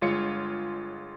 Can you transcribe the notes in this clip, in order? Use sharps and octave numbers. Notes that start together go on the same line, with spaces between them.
G1 G#3 F4 C#5 C#7